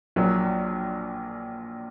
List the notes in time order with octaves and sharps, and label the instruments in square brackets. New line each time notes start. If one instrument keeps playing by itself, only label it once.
[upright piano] A#1 A#2 F#3